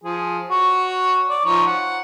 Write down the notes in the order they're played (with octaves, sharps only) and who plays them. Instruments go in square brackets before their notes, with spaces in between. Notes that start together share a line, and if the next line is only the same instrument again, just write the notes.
[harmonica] F3 G#4
F#4 C#5
D5
F3 D#4 C#5
F#5